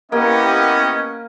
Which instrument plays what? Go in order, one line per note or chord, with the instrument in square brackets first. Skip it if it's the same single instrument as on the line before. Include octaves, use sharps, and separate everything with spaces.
[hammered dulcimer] A#3 [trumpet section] B3 D#5 [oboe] C#4 [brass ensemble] E4 G4 A#4